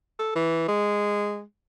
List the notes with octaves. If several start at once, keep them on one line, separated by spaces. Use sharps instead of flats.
A4
E3
G#3